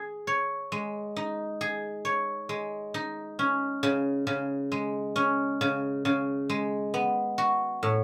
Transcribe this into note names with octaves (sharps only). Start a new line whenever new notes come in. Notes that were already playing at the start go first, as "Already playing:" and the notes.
Already playing: G#4
C#5
G#3
D#4
G#4
C#5
G#3
D#4
C#4
C#3
C#3
G#3
C#4
C#3
C#3
G#3
B3
F#4
A2